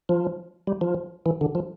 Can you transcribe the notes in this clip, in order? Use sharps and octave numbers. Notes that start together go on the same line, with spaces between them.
F3
G3
F3
E3
D3
F3